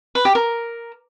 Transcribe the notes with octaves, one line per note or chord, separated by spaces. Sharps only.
B4
G4
A#4